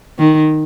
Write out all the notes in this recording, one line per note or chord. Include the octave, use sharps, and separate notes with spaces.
D#3